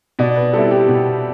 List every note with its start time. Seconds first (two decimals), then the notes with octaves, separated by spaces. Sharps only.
0.19 B2 D5
0.36 B4
0.53 G3 C4 E4 A4
0.71 G4
0.89 B2